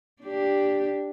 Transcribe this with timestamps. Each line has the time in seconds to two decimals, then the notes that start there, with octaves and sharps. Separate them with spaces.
0.22 D4 G4